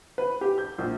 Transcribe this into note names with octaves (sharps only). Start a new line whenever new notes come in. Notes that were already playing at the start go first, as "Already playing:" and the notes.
B4
G4
G6
A#1